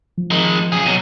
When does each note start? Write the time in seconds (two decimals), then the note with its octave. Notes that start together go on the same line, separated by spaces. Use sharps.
0.18 F3
0.31 D#3 G#3
0.72 F#2 G#4
0.86 B2 F#3